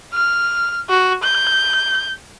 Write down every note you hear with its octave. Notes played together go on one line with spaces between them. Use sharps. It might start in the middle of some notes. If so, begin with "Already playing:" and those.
F6
F#4
G6